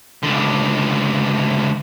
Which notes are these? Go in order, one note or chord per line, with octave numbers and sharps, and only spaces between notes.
C#2 D3